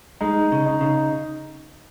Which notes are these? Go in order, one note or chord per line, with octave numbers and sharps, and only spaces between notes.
G#3 D#4
C#3
D#4
C#3